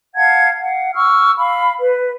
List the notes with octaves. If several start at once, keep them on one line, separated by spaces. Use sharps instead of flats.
F5 F#5 A5 G#6
F5 F#5
C#6 E6 F6
F5 B5
B4